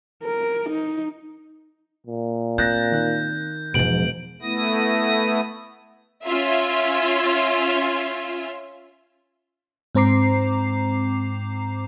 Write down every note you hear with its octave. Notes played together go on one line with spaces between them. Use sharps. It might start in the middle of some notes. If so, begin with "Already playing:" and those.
A#4
D#4
A#2
C4 F#6 G6 A6 A#6
D#3 F#6
E1 G#2 B2 F3 D7 F#7
A3 B3 E4 D#6 A#6
C#4 F4 E5
G#2 C4 C5 A#5 D6 C7